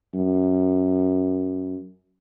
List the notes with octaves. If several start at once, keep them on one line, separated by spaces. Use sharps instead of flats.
F#2